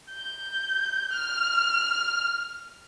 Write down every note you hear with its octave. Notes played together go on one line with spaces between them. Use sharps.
G6
F6